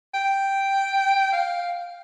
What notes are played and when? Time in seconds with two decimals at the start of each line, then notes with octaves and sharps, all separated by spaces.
0.14 G5
1.33 F5